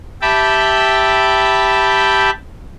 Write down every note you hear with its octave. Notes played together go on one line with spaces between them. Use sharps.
G4 E5 G5 A5 B5